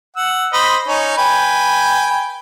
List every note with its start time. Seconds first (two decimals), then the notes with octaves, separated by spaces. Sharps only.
0.16 F#5 E6
0.53 C5 D#5 B5
0.88 C#4 D#4
1.17 B4 G5 G#5